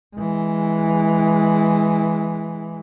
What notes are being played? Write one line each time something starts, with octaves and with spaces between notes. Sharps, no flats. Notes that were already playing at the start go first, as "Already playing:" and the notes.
E3 G#3